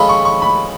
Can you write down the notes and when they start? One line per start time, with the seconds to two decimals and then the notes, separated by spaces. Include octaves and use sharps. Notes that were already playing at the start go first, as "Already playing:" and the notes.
Already playing: G#3 C#4 F4 A4 C#5 B5
0.09 C#6
0.25 C#6
0.42 B5